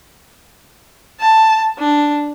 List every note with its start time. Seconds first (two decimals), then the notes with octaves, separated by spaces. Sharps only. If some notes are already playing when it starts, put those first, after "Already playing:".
1.20 A5
1.78 D4